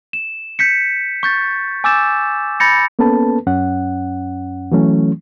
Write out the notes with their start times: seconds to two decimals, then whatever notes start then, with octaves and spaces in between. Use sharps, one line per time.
0.13 E7
0.59 G6 B6 C#7
1.23 C#6 G6 A6
1.84 G#5 D6 E6 G6 A6 E7
2.60 B5 G6 A6 A#6 C#7
2.99 A#3 B3 C#4 A4 B4 A5
3.47 F#2 C#4 F#5
4.72 E3 F#3 A3 C#4